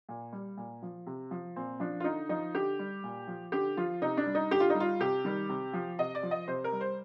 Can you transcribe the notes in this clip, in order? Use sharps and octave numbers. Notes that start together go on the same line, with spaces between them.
A#2
G3
A#2
F3
C3
F3
A#2 C4
F3 D4
F4
D3 D#4
F3 D#4
D3 G4
G3
A#2
F3
D3 G4
F3 F4
C3 D#4
D4
G3
D#4
D3 G4
F4
D#4
G3
F4
C3 G4
D#3 G3
C3
F3
C3 D#5
D5
F3
D#5
C3 C5
A#4
G3
C5